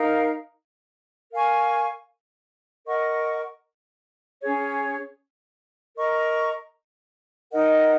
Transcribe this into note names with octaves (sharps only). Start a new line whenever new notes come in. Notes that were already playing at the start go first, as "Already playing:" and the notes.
Already playing: D#4 A#4 F5
A#4 F5 G#5 C#6
A#4 D#5 F#5 C#6
C#4 G#4 C#5
A#4 D#5 A#5 C#6
D#4 A#4 D#5 F#5